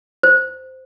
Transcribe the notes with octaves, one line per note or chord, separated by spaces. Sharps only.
C5